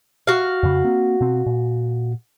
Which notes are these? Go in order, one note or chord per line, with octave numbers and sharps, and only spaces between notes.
F#4 F5
F2 C#3
A#3 C4
B2 C4
A#2